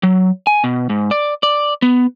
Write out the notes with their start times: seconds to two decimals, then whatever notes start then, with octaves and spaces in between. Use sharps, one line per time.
0.03 F#3
0.47 G#5
0.64 B2
0.89 G#2
1.11 D5
1.43 D5
1.82 B3